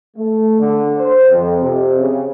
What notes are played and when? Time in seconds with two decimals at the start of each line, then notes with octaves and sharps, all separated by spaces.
0.16 A3
0.59 D3
0.97 C5
1.30 F2
1.61 C3
1.99 C#3